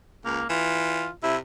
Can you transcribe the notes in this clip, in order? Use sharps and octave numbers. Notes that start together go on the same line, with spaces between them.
C#2 A#3
E3 F4
C3 E4